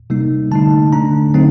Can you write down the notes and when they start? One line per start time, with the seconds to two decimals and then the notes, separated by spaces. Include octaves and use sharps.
0.10 C3 G3 A#3 D#4
0.51 D3 A3 D#4 A5
0.93 D3 A3 D4 A#5
1.34 D3 F#3 A3 C4 D#4